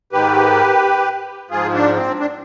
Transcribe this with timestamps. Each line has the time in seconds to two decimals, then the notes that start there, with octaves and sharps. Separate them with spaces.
0.12 G#2 D#3 G4 B4
1.50 G#2 F3 F4 G#4
1.74 D4
1.96 C4
2.20 D4